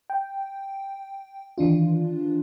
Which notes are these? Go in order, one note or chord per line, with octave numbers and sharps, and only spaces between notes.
G5
D#3 E3 D4 F4